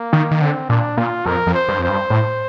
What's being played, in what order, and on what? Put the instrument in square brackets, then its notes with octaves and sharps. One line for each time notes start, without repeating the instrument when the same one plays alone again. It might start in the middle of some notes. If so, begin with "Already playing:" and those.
Already playing: [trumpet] A#3
[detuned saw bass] D#3
D#3
[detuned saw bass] D3 [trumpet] C4
[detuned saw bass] A#2 [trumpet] D4
[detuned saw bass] A#2 [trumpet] F4
[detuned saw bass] F2 [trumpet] A#4
[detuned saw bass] F2
[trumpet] C5
[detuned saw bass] G2
[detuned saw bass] F2 [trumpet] C5
[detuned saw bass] G2
A2